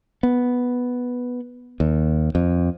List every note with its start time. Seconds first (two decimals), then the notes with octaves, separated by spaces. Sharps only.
0.23 B3
1.80 D#2
2.35 F2